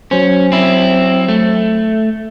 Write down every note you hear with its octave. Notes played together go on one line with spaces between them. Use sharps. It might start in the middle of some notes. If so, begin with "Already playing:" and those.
F#3 C#4 C5
C4 E4
A3